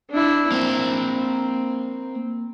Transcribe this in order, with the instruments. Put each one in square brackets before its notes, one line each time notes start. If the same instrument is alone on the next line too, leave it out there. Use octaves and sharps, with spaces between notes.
[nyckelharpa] D4 E4
[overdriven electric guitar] A#3 C5 [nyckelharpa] C4